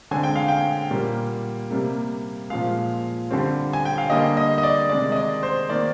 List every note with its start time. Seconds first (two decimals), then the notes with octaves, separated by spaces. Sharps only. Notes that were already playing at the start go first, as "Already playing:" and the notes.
0.11 D3 G#3 C4 G#5
0.23 G5
0.36 F5
0.48 G5
0.91 A#2 G3 A#3
1.71 C3 G3 A#3
2.50 A#2 F3 G#3 F5
3.31 D3 G3 C4
3.73 G#5
3.85 G5
3.98 F5
4.10 D3 G3 A#3 D#5
4.37 D#5
4.58 D#5
4.63 D5
4.89 C3 D#3 G#3 C4 D5
5.12 D#5
5.17 D5
5.43 C5
5.69 D#3 A#3 D5